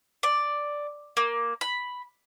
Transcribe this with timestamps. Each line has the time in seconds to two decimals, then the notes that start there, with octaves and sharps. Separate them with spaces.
0.23 D5
1.17 A#3
1.61 B5